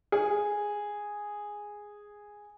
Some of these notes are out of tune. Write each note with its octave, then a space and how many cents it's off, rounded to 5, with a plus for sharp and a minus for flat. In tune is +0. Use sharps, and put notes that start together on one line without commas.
G#4 -5